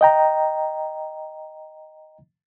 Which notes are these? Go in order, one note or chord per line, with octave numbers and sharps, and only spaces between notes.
D#5 G5 A#5